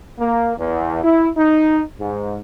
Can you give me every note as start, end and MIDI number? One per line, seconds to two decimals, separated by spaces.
0.19 0.52 58
0.57 0.98 40
1.03 1.28 64
1.36 1.82 63
1.99 2.41 44